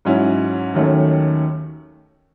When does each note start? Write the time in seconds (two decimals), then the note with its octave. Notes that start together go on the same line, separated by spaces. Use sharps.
0.05 G#2 F#3 C#4 E4
0.74 D#2 D#3 F#3 A3 C#4